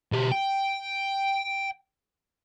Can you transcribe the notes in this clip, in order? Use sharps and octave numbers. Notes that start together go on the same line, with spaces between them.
B2 G4
G5